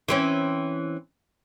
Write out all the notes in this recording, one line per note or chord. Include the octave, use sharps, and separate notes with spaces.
E3 C4 C#4